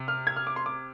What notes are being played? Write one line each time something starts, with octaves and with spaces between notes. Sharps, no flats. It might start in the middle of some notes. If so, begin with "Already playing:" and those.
Already playing: C3
F6
G#6
F6
D6
C6
D6